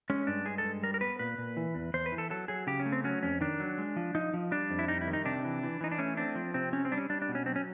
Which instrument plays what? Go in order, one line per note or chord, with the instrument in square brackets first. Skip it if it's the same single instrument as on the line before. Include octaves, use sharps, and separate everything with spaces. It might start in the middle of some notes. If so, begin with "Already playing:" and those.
[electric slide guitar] G#3 C#4
G2 D4
G#3 G#4
A4
G2
G3 A#4
A#4
B3 B4
A#2 B4
A#2
E3
E2
E2 C5
B4
E3
A4
F#3 A4
F#3 G#4
C#3 G4
C#4
A3
C4
F#3 C#4
F2 C#4
D#3 D4
F#3
G#3
F3
F3 D#4
F3
G3 D4
F2
E4
G3 D#4
E4
D#3
D#4
C3 D4
E3
E3
E3 D#4
D4
A3 C#4
C4 D4
F3
C3 C4
C4 C#4
C4
G3 D4
C#4
G3 D4
D4
B2
C#4
F#3 C4
C#4